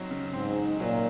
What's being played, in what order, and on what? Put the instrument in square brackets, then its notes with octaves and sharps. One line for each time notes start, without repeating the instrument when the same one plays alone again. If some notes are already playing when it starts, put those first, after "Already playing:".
Already playing: [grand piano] F#3 C4 D#4
C#3
[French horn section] G#2 [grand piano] C4
[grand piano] D#4
[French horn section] A#2 [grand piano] F#3